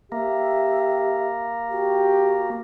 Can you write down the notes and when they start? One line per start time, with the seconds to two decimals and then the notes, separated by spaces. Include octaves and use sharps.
0.12 A#3 G4 E5
1.71 F#4 G4